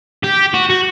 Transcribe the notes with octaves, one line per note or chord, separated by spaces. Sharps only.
G4
F#4
F#4